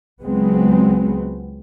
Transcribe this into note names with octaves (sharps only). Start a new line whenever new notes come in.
C#2 F#3 G#3 B3 C4